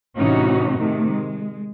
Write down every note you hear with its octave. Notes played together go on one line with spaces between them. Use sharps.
A2 C3 E3 C#4 D#4 F#4
C3 D#3 A3
G#3